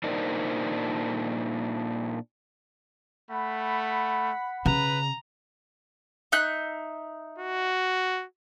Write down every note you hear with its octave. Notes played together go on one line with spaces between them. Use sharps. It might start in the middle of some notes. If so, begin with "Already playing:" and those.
A#2 D4 D#4 A#4 C5 D5
A3 F#5 B5
C#3 B4 A#5
D#4 E5 F#6
F#4